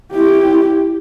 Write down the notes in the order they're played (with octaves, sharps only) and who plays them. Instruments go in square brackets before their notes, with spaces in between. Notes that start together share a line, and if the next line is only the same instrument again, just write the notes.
[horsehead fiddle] E4 G4